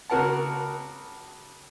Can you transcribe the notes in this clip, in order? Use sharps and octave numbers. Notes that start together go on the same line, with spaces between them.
C#2 F#4 A#4 F#5 A5